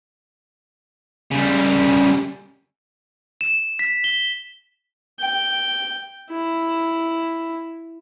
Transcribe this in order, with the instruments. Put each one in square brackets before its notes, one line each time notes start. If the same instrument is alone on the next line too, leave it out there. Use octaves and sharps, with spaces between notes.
[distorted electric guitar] C#3 G3
[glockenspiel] E7
B6
G7
[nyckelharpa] G5
E4